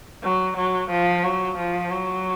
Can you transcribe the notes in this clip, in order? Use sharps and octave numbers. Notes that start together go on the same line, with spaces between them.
F#3
F#3
F3
F#3
F3
F#3